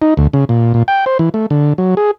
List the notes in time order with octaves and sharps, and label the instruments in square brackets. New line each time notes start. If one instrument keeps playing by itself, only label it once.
[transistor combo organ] D#4
D2
C#3
A#2
A#2
G5
C5
E3
A3
D3
F#3
G#4